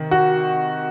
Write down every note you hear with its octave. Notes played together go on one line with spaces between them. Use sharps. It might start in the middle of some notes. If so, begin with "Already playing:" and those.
Already playing: C3 D#3
F#4